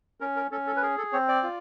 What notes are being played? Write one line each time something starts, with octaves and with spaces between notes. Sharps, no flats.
C#4 A#4
A#4
C#4 A4
A4
B4
G#4 A#4
A4
C4 C#5
D5
F4